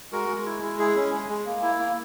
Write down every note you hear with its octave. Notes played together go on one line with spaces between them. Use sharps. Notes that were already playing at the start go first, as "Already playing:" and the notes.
G#3 F#4 A#4
G#3
E4
G#3
E4 G#4
C#4
G#3
G#3
A#3
E4
A#3